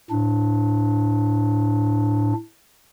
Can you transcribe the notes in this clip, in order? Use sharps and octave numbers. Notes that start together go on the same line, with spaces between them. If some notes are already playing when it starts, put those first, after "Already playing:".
A2 D4